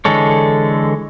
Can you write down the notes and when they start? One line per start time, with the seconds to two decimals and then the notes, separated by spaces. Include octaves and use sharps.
0.05 D3 E3 G#3 A4 C#5